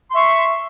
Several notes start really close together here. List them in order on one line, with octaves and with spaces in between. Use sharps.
C6 E5 C#6